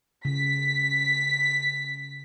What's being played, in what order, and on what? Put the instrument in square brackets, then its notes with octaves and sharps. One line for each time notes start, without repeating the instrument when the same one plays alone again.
[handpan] C#3 [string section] B6